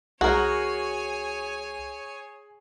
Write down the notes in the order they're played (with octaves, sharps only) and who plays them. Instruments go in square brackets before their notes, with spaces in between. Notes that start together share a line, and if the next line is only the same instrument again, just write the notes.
[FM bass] C2 [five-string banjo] F#4 A#4 [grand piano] G#4 [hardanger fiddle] C#5 G#5